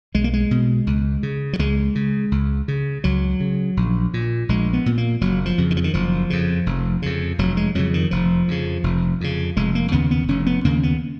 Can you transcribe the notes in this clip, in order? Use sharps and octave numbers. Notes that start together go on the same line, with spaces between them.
B1 G#3
A#3
G#3
B2
C#2
C#3
F#3
C#2 G#3
C#3
C#2
C#3
C#2 F#3
C#3
A#1
A#2
A#1 G#3
B3
A#2
A#3
F#1 F#3
F3
F2 C#3
D#3
F3
D#3
F#1 F3
F2 C#3
F1
F2 C#3
F1 F#3
G#3
F2 C#3 F#3
D#3
F1 F3
F2 C#3
F1
F2 C#3
F1 G#3
A#3
D#2 C#3 B3
B3
F1 C#4
B3
D#2 C#3 A#3
B3